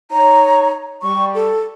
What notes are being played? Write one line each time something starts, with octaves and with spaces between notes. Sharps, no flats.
D#4 C#5 A#5
G3 C#6
A4